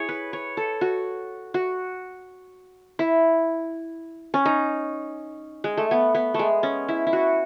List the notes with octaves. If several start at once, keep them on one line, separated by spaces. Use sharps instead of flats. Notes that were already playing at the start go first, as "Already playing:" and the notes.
Already playing: E4 G#4 C#5
B4
C#5
A4
F#4
F#4
E4
C#4
D#4
G#3
A3
B3
B3
G#3 A3
C#4
E4
E4
F#4